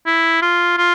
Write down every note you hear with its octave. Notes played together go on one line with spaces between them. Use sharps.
E4
F4
F4